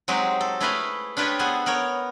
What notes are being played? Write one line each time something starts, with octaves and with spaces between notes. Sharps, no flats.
F#3 G#3 C4 D#4 F#4 G4
A4
A3 E4 G#4 B4 D#5 F5
D4 F4 G4 B4 C#5 D#5
B3 G#4 A4 C5 F#5 G#5
B3 A#4 C#5 G5